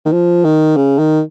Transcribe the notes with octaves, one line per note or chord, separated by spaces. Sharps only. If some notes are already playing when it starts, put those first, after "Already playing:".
D#3
F3
D#3
C#3
D#3